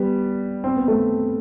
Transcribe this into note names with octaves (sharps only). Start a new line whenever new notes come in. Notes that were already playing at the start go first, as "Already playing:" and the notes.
Already playing: G3 B3
C4
B3
A3 C4